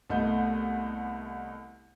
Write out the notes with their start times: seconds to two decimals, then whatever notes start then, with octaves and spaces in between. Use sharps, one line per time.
0.10 C2 A3 B3 D#5 G6